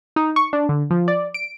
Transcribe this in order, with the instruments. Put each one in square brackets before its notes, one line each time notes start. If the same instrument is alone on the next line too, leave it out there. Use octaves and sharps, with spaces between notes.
[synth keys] D#4
C#6
D4
D3
F3
D5
D7